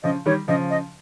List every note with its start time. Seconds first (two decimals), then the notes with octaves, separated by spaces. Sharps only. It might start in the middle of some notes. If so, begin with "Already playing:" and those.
0.03 C#3 F3 D#5
0.26 D#3 G3 C#5
0.48 C#3 F3 D#5
0.70 D#5